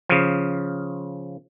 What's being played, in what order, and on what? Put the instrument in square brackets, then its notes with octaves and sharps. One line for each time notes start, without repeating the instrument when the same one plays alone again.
[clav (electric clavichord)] C#3 F3